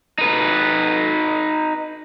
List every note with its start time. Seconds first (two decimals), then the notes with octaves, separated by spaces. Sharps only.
0.18 D#4 B4